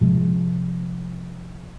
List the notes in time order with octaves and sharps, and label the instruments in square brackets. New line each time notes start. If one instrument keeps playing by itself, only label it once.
[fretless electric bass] C3 F3 G#3